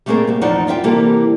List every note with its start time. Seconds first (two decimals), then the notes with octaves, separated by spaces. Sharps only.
0.06 G3 A3 A#3 C4 G#4 A#4
0.27 C3 B3
0.41 E2 F3 D#4 C5 D5 F#5
0.67 G3 F4 E5 G5
0.84 C3 E3 G3 A#3 G4 A4